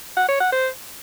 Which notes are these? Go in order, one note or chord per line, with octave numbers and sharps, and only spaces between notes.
F#5
C#5
F#5
C5